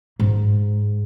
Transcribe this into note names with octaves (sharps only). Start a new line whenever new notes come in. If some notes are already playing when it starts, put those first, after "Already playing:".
G#2